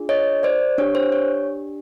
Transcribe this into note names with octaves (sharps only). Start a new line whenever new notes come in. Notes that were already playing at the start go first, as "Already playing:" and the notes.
Already playing: D4 F4 G#4
C#5 D#5
C5 D5
D4 G4 C#5
C5
C#5